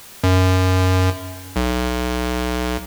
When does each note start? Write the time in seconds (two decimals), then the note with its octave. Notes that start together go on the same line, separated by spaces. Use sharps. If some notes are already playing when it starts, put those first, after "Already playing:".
0.24 F#2
1.56 B1